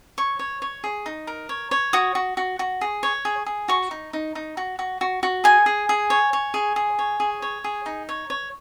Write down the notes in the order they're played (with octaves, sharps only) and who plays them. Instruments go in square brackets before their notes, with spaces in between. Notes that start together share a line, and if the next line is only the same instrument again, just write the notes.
[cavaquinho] C#5 C#6
C#5
C#5
G#4
D#4
A#4
C#5
C#5
F#4 D#6
F#4
F#4
F#4
G#4
C#5
G#4
G#4
F#4 C#6
D#4
D#4
D#4
F#4
F#4
F#4
F#4
G#4 G#5
G#4
G#4
C#5
C#5
G#4
G#4
C#5
G#4
C#5
G#4
D#4
C#5
C#5